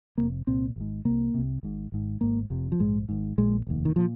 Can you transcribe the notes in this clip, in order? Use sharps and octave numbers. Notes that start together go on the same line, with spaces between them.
F1 F2 C3 A#3
C2 A#2 C4
G#1 G#2
C2 C3 A#3
C2 C3
G#1 G#2
G#1 G#2
G#1 G#2 A#3
F1 F2 C3
F3
A#1 G#2 G#3
G#1 G#2
A#1 A#2 G#3
F1 D#2
D#3
A#2 F3